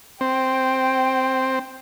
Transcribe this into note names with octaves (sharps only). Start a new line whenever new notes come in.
C4 G5